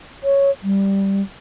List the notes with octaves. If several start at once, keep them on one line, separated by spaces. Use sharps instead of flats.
C#5
G3